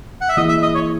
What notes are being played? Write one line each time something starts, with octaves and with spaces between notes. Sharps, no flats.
F#5
E5
E3 A#3 E4 G#4 D#5
E5
D#5
C#5